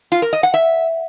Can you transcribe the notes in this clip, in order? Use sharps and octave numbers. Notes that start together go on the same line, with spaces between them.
F4
A#4
D#5
F#5
E5